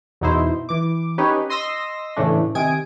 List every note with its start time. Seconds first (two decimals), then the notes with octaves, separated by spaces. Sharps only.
0.21 E2 B2 D#4 E4 C5
0.69 E3 D6
1.18 C#4 D#4 G4 B4 C#5
1.50 D#5 C6 D#6 E6 A#6
2.16 A2 C#3 E3 A3 D4
2.55 C3 D#3 G#5 D#6 D7